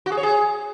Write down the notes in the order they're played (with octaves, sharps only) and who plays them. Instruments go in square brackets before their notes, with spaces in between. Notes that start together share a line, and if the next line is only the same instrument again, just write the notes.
[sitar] F#4
G#4
C#5
G#4